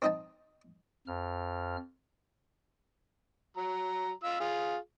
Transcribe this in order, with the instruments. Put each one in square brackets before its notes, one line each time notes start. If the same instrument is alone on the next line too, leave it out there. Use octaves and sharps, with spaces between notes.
[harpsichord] C4 D#4 C5 D#5 G5 A5
[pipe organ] F2 F6
[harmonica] F#3 A#5
F4 E6
F4 G#4